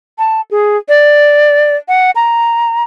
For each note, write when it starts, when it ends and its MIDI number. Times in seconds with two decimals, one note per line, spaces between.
0.18 0.41 81
0.51 0.77 68
0.89 1.76 74
1.88 2.11 78
2.16 2.83 82